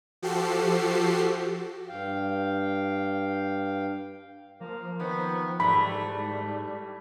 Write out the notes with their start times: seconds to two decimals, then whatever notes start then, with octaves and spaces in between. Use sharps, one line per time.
0.22 F3 F#4 G4 A4 C7
1.89 G2 F5 G5
4.61 F3 A#3
5.00 D#3 B3
5.60 G#2 E3 G3 A3 B5